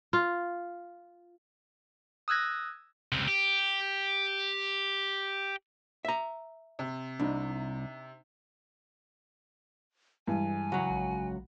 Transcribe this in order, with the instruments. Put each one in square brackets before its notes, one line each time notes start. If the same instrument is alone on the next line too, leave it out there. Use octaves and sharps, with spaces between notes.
[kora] F4
[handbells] D#6 E6 F#6 G#6 A#6
[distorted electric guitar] C#2 C3
G4
[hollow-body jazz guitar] E5 A#5
[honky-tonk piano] C3
[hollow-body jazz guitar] C2 [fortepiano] D4 D#4
[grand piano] G2 [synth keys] E3 G#3 E4 [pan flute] G#5
[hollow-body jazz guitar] C#2 F#3 [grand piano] F#4
[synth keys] A#1